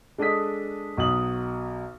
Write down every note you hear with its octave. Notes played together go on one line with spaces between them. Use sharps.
G#3 D4 A4 D#5 D#6 B6
B1 F#4 D#6 F#7